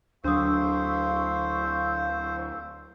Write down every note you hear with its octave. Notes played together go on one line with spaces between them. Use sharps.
D2 F#3 D4 C5 F5 C#6 D#6 E6